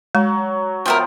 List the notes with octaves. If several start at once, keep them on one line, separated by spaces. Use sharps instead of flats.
F#3 G#3
F3 B3 A#4 E5 G5